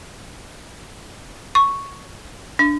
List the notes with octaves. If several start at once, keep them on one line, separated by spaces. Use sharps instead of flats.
C#6
D4